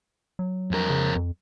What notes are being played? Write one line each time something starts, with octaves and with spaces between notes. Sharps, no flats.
F#3
F2 A#4
C#3
F2